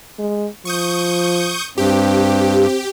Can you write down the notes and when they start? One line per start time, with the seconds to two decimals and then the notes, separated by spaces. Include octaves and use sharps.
0.19 G#3
0.65 F3 C#6 D#6 G6
1.78 G2 C4 G4